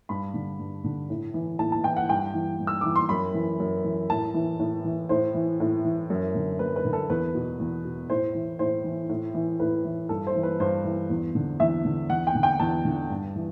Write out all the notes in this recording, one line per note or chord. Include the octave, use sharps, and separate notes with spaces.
G2 B5
D3
G2
D3
A2
E3
A2 A5
A5
E3 G5
F#5
G2 G5
E3
G2
E6
E3 D6
C6
F#2 B5
E3
F#2
E3
A2 A5
E3
A2
E3
A2 C5
E3
A2
E3
F#2
D3
F#2 B4
B4
D3
A4
E2 B4
B2
E2
B2
A2 C5
E3
A2 C5
E3
A2
E3
A2 B4
E3
G2 A4
C5
E3
B4
G2 C5
E3
E2
D3
E2 E5
D3
E2 F#5
G5
D3
G5
E2 A5
D3
G2
E3